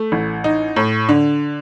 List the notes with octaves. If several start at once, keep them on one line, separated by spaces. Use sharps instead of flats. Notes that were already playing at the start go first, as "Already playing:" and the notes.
Already playing: A3
A1
D#4
A2
D3